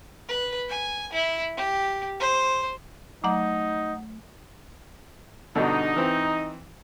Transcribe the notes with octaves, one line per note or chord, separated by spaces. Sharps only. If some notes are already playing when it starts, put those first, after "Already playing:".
B4
G#5
E4
G4
C5
F#3 A3 D#4 F#5 A#5
G2 B2 D3 D#4
E3 C4